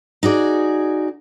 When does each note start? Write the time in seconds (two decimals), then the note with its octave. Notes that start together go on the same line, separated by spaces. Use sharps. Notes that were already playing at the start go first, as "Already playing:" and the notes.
0.23 D#4 F#4 G#4 D5